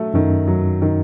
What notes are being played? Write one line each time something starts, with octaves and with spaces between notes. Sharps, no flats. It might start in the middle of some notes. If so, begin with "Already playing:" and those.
Already playing: F#3 A3
F#2 D#3
F#3
D#3